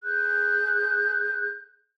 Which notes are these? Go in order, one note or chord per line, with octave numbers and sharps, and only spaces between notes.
G#4 F#6 G6